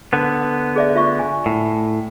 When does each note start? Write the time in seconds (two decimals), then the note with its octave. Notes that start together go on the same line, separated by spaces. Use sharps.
0.13 D3 B3
0.76 G#4 D5 E5
0.96 F4 E5 C#6
1.19 G#5
1.46 A2